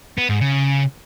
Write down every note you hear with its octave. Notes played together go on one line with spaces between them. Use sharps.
B3
G#2
C#3